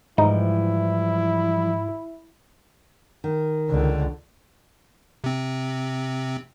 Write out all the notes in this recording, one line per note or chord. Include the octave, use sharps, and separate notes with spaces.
G#2 E3 F3 G3 D#4 E4
D#3
C#2 D3
C3 C4